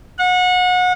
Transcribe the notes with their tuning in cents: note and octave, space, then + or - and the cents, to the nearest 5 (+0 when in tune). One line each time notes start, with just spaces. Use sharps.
F#5 -30